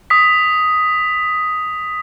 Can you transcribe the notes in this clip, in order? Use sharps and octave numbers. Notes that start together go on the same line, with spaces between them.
D#6 B6